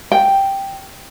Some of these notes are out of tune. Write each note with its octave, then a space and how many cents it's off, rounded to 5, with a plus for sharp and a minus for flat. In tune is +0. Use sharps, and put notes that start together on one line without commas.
G5 +0